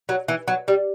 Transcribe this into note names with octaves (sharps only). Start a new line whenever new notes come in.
F#3
E3
F#3
G3